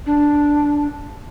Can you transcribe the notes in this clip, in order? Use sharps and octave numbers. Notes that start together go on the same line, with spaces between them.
D4